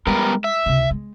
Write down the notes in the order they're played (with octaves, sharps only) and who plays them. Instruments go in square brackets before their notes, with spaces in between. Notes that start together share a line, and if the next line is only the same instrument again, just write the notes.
[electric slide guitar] G3 B3 A#4 [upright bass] G#3
[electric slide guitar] E5
[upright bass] C#2 C3
G#3